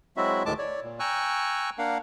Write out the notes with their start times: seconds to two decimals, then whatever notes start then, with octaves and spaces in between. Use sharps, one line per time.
0.17 F#3 G#3 C4 E4 F#4 E5
0.46 D2 A2 D#3 G#3 A5 D6
0.59 C#5 D5
0.83 A#2
1.00 G5 G#5 A#5 C#6 E6 F#6
1.78 A#3 D4 A#4 F5 F#5